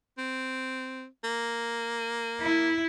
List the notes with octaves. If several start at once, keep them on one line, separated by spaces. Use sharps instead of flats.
C4
A#3
E4